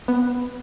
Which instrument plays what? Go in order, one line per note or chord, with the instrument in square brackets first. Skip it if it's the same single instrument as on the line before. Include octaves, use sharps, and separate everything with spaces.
[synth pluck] B3